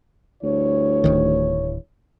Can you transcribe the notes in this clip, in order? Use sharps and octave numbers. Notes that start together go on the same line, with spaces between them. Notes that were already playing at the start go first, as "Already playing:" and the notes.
D2 G2 E4 C#5
D1 A#1 D#3